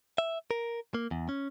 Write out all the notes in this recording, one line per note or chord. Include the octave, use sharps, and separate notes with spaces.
E5
A#4
A#3
E2
C#4